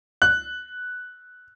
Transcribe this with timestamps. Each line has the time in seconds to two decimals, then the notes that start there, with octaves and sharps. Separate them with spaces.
0.22 F#6